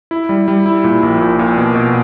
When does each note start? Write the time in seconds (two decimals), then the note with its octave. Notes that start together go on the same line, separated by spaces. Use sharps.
0.11 E4
0.29 G3
0.48 G3
0.66 E4
0.84 A#2
1.03 A#1
1.21 A#2
1.39 A#2
1.58 B2
1.75 B2